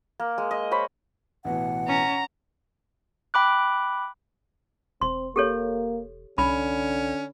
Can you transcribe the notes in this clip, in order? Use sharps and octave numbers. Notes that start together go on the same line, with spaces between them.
A#3
G#3
D#5
C5 C#5 B5
A1 B2 E3 F#5
C#4 A#5
G5 B5 D6 F#6
E1 C4 C6
A#3 G4 A4 C#5
C2 D3 C#4 B5